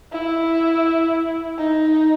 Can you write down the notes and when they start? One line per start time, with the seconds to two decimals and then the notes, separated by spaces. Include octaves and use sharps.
0.12 E4
1.58 D#4